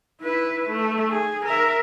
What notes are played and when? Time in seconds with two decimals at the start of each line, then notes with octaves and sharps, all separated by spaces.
0.22 E4 B4
0.69 A3
1.09 G#4
1.45 A#4 E5